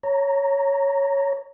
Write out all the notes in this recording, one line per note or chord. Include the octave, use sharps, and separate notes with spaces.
C#5 A#5